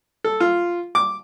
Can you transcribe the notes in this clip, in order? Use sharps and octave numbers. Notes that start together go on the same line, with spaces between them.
A4
F4
D6